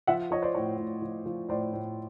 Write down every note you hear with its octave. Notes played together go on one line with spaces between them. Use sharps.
F3 E5 F#5
F3 C#5 D#5
C5 D5
A2 C#5
A2
F3
F3
A2 C5 D5
A2